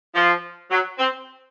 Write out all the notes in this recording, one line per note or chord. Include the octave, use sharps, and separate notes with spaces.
F3
F#3
C4